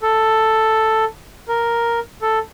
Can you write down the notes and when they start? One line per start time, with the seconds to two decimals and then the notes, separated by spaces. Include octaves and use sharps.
0.02 A4
1.48 A#4
2.22 A4